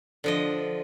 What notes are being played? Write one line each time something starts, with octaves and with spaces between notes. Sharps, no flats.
D3 F3 D#5